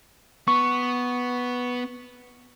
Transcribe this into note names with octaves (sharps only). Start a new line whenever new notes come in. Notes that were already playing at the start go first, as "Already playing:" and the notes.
B3 C#6